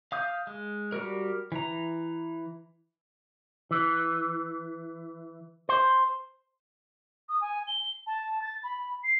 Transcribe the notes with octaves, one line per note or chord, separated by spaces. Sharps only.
F5 D#6 G6
G#3
G3 F#4 A#4
E3 A#5
E3
C5
D#6
G#5
G7
A5
A6
B5
C7